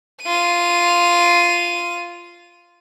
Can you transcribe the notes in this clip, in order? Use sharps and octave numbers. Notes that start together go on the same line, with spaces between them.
F4 D#7